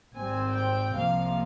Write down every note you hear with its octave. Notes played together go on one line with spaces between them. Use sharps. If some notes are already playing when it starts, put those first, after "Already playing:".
G#1 G#2 G3 C4 G#5
G5
C2 C3 F3 A#3 F5